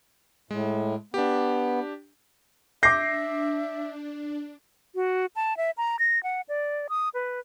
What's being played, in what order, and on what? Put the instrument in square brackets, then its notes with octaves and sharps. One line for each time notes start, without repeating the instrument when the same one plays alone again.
[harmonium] A2 [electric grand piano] G#3
[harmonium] B3 [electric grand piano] D4 G4
[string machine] D4 [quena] E5 [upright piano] D6 C7 [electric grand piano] G6 A#6
[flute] F#4
A5
E5
A#5
A#6
F#5
D5
D#6
B4